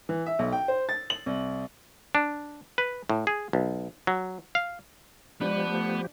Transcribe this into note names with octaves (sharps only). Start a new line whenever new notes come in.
E3
E5
B1
G5
C5
A6
F#7
C2
D4
B4
A2
G#4
B1
F#3
F5
F3 G#3 B3 D4 G4 B4
A3